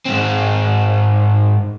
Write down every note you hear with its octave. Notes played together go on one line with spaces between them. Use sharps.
G#2 C4